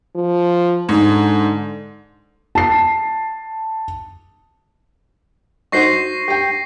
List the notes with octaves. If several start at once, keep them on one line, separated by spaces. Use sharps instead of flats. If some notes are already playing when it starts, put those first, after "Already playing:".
F3
G#2 D3
A5 C7
D#4 F#4 C5 C#6 A#6 C7
G4 G5